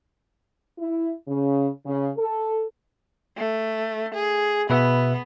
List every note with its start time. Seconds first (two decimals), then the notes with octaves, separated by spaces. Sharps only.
0.79 E4
1.27 C#3
1.86 C#3
2.18 A4
3.37 A3
4.14 G#4
4.70 B2 B3 B4 E5